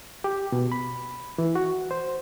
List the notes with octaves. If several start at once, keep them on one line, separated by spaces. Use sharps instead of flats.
G4
B2
B5
E3
F#4
C5